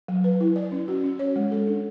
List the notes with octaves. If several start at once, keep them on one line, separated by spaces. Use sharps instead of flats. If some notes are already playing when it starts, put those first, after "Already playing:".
F#3
B4
E4
D5
C#4
F#4
C#4
C#5
G#3
A4
D4